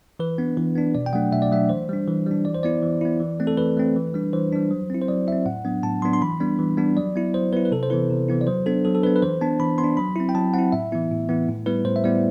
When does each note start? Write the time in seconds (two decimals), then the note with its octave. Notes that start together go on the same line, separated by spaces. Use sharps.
0.19 E3 B4
0.38 B3 D4
0.57 E3
0.76 B3 D4
0.95 B2 D5
1.06 G5
1.13 F#3 A3 D4 F#5
1.32 B2 E5
1.42 D5
1.51 F#3 A3 D4 E5
1.69 E3 C5
1.89 G3 D4
2.07 E3
2.26 G3 D4
2.45 E3 D5
2.55 C5
2.63 B3 E4 D5
2.82 E3
3.01 B3 E4
3.20 E3
3.40 A3 C4
3.47 A4
3.57 E3 B4
3.77 A3 C4
3.96 E3
4.14 G3 D4
4.33 E3 C5
4.52 G3 D4
4.71 F#3
4.90 C4 E4
5.02 C5
5.08 F#3 D5
5.27 C4 E4 E5
5.46 A2 F#5
5.65 F#3 B3 D4
5.83 A2 A5
6.02 F#3 B3 D4 C6
6.13 C6
6.22 E3 B5
6.40 G3 B3 D4
6.59 E3
6.77 G3 B3 D4
6.97 F#3 D5
7.16 B3 E4
7.34 F#3 C5
7.53 B3 E4 B4
7.65 B4
7.72 C3 A4
7.83 C5
7.90 E3 B3 E4 B4
8.10 C3
8.28 E3 B3 E4
8.41 D5
8.47 F#3 C5
8.66 B3 D4 A4
8.85 F#3 A4
8.95 A4
9.03 B3 D4 B4
9.16 B4
9.22 E3 C5
9.41 B3 D4 A5
9.60 E3 B5
9.78 B3 C6
9.84 D4
9.97 F#3 B5
10.16 C4 E4
10.29 G5
10.35 F#3 A5
10.54 C4 E4 F#5
10.72 A2 E5
10.92 E3 B3 E4
11.11 A2
11.29 E3 B3 E4
11.49 A2
11.66 G3 B3 E4 B4
11.85 A2 C5
11.96 E5
12.04 G3 B3 E4 D5